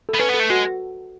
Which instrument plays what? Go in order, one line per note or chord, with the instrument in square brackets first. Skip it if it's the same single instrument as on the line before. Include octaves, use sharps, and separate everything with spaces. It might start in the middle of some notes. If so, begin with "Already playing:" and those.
[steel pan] A4
[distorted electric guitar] B3
[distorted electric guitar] C#4 [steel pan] B4
[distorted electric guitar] B3 [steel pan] A4
[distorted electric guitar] A3
[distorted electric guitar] G#3 [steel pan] F#4